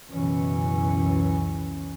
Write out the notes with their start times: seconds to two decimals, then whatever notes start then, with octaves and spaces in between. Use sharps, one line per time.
0.11 C#2 F#2 B2 E3 C#4